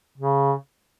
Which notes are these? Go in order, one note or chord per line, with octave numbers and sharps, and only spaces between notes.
C#3